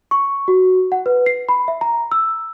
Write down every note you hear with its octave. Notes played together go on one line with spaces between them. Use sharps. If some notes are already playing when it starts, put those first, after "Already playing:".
C#6
F#4
F#5
B4
C7
B5
E5
A#5
E6